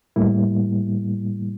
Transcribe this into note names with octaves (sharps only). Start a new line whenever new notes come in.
A2 G3 A#3 E4